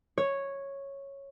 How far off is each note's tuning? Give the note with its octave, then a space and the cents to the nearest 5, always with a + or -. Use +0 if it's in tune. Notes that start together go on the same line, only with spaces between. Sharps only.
C#5 -5